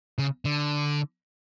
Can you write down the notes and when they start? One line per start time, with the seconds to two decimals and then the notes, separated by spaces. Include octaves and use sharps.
0.18 C#3
0.45 D3